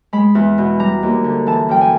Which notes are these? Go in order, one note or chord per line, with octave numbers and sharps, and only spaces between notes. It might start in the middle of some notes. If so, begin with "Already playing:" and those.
G#3 B5
E2
B2
G3 A#5
D#2
D3
E3 A5
F#2 G5
G#5